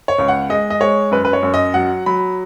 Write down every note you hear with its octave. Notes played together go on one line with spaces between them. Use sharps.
C#5
C#2
F#5
G#3 D#5
D#5
G#3 C#5
F#2 B4
B4
C#5
F#2
D#5
F#3 F#5
F#3 B5